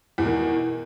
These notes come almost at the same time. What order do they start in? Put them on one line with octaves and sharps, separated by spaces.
E2 B2 D#3